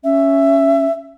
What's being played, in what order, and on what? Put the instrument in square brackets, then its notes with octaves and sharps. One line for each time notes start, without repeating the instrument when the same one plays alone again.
[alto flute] C#4 [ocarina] E5